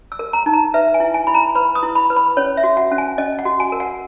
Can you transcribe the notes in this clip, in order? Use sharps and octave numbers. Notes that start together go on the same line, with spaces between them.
E6
A#4
A#5
D#4
A#5
B4 E5
G#5
E4
G#5
E4 B5
A#5
B4 B5
D#6
E4
B5
B4
B5
C#4 C#5
E5
F#4
F#5
C#4
G#5
C#4 D#5
F#5
F#4
G#5
A#4
F#5